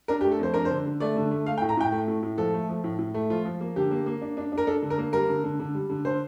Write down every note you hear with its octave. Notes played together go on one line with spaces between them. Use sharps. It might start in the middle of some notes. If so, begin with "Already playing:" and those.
D4 A#4
G4
A3
A4
F2 C5
D4 A#4
D3 C5
D3
A3 D5
D3
A3
A3 F5
G5
A2
A#5
A2 G5
A3
A2
A2
F3 A4
A3
F3
A2
A2
A3
F3 F4
F3
A#3
D3 G4
A#3
A#3
D4
D4
D4
A#4
D4 A4
D3
A#4
A#3
G3 A#4
D3
D3
D3
G3
D3
D3 C5